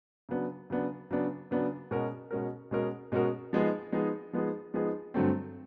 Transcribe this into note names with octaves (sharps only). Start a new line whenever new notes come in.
C#3 F#3 B3 D4
C#3 F#3 B3 D4
C#3 F#3 B3 D4
C#3 F#3 B3 D4
B2 G#3 C#4 F#4 A#4
B2 G#3 C#4 F#4 A#4
B2 G#3 C#4 F#4 A#4
B2 G#3 C#4 F#4 A#4
F3 G#3 B3 D#4 G#4
F3 G#3 B3 D#4 G#4
F3 G#3 B3 D#4 G#4
F3 G#3 B3 D#4 G#4
G2 D3 F#3 A3 C4